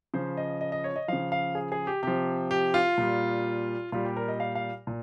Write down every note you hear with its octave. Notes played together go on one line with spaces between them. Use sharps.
C#3 F3 C5
D#5
D#5
D#5
C#5
D#5
C#3 F3 F5
F5
G#4
G#4
G4
C3 F3 G4
G4
F4
A#2 G3
A#2 G3 F4
G4
A#4
D#5
F5
F5
A#2